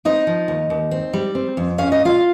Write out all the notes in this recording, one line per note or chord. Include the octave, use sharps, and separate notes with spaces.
C4 D#4 D#5
F3
D#2
D#2
C4
G3
C4
F2
C#4 F5
D#5
A#2
F4 F5